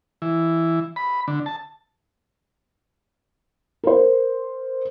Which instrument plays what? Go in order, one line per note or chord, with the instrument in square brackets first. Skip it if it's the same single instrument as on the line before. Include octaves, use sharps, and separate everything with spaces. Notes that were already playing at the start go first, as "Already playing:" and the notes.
[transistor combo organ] E3
B5
D3
A5
[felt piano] A#4 C5